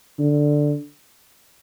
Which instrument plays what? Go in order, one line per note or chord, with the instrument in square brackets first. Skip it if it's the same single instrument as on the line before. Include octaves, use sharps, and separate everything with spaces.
[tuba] D3